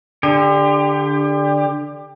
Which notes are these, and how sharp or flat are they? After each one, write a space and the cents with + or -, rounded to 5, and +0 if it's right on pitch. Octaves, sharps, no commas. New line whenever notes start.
D3 +0 G4 +30